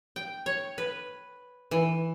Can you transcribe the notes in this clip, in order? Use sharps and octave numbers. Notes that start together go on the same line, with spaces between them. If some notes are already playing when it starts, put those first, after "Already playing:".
G5
C#5
B4
E3